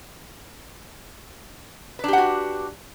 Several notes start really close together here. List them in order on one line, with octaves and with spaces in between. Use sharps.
B4 D4 G4 F#5 F#4